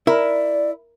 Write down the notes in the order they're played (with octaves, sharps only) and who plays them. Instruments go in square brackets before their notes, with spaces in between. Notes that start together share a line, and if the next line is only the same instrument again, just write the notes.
[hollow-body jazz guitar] E4 [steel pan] A#4 [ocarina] D5